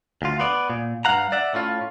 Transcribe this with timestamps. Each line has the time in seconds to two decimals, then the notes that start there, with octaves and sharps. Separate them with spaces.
0.22 D2 F4
0.40 B3 D5
0.70 A#2
1.05 G2 F3 F5 F#5 A#5
1.32 D5 E5 F#5
1.54 A2 C#4 F4